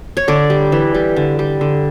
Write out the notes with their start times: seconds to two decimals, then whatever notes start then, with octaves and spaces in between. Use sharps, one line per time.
0.17 C#5
0.28 D3 D5
0.50 G3
0.72 E3
0.95 G3
1.16 D3
1.39 G3
1.61 D3